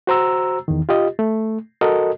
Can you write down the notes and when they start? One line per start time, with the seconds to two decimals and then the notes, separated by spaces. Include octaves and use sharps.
0.07 F#4 C5 A#5 E6
0.68 E2 D#3
0.89 F4 G4 D#5
1.19 A3
1.81 F#4 A4 A#4 D#5